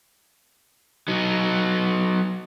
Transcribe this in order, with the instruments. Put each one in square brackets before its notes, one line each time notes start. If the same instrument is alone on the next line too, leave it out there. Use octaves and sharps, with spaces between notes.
[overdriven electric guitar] F#3 D#4